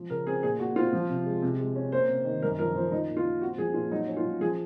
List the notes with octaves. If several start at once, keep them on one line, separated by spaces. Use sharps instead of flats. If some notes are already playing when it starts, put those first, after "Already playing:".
Already playing: F3
C#3 A#4
C4 G#4
A#2 G#4
A#2 F#4
C4 F4
F3
C3
G#3
C3
G#3
C#4
A#3 C5
C3
D#3
F#2 A#4
F3 A#4
F3 C5
F3 D#4
A#2
F4
A#2
C4 F#4
F3 G#4
A#2 F4
F#3 D#4
C#4
F4
F#3
F3 G#4